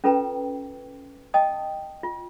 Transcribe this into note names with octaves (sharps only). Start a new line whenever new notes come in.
C#4 F4 A4 B4 G5 A#5
D#5 G5 A5 D#6
F4